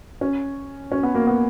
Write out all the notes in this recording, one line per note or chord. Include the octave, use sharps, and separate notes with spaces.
C#4
C#4
B3
A#3
B3